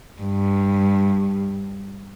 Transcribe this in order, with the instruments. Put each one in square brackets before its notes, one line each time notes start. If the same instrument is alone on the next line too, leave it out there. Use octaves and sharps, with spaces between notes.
[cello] G2